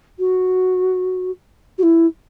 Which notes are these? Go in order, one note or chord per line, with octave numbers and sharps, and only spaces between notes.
F#4
F#4
E4